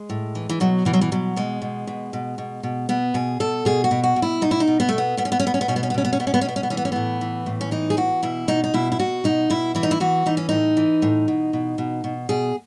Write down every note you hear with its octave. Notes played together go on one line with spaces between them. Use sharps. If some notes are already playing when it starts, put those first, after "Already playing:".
Already playing: G#3
A2
E3
E3
B2 F#3
B2 E3
F#3
E3
B2 F#3
B2 G#3
B2
B2
B2
B2
B2
B2 B3
B2 G#4
B2 A4
B2 G#4
F#4
B2
F#4
B2
E4
B2 D#4
E4
D#4
B2
B3
B2 A3
B3
B2 B3
C#4
B3
C#4
B2 B3
C#4
B3
B2 C#4
B3
C#4
B3
B2 C#4
B3
C#4
B2 B3
C#4
B3
C#4
B2 B3
C#4
B3
E3 C#4
B3
C#4
A2 B3
E3
A2
C#4
E3 D#4
G#4
E3 F#4
B2 E4
B2 D#4
D#4
B2 E4
E4
B2 F#4
B2 D#4
B2 E4
E3 E4
D#4
E4
E3 F#4
E3 D#4
C#4
A2 D#4
E3
A2
B2
B2
B2
B2
B2 G#4